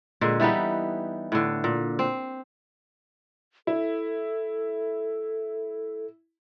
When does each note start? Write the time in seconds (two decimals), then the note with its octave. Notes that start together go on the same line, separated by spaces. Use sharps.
0.21 A#2 D3 G#3
0.40 E3 G3 B3 D#4
1.32 A2 D3
1.64 A#2
1.99 C4
3.67 E4 A4